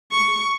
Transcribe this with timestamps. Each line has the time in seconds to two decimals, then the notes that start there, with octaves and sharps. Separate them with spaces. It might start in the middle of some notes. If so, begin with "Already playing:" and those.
0.11 C#6